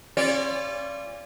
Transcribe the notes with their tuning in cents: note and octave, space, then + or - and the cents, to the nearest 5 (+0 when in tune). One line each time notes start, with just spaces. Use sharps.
C#4 -35 F4 -30 D5 -15